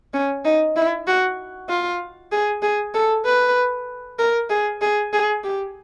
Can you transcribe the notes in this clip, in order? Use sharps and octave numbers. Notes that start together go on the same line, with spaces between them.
C#4
D#4
E4
F#4
F4
G#4
G#4
A4
B4
A#4
G#4
G#4
G#4
G4